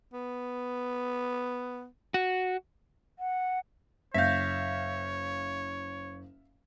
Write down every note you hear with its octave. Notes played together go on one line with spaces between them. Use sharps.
B3
F#4
F#5
F#1 C#5 E5 F5 G6 A#6 B6